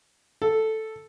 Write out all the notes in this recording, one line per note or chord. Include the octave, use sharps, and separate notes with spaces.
A4